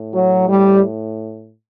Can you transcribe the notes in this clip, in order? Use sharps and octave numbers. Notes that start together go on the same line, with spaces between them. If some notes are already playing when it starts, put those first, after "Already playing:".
Already playing: A2
F#3
G3